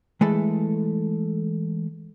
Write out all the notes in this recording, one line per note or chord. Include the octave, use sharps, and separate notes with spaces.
E3 G#3 A3 A4